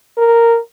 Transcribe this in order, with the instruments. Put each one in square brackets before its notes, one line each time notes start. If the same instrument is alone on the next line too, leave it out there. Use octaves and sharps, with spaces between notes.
[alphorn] A#4